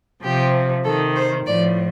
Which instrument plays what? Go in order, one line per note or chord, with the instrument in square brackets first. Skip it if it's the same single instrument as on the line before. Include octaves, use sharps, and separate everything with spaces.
[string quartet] C3 F3 G4
C3 D#3 A4
C5
A2 F3 D5